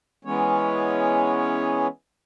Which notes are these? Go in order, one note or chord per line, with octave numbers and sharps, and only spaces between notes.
E3 G#3 B3 C#4 C#5